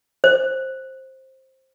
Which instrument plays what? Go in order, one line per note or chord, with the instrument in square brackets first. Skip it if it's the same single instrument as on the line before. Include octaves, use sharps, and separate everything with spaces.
[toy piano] C5